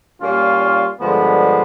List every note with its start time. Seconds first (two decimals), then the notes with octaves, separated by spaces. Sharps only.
0.21 A#2 G3 A#3 C#4 F4
1.00 G2 D3 F3 G#3 B3